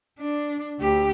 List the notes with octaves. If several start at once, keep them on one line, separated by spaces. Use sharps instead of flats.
D4
D2 G4